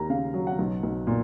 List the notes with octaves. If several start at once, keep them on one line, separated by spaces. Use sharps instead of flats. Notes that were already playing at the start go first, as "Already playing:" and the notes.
Already playing: D#2 A#3 A#5
C#3 F5
F#3
F#5
B1
B1
A#2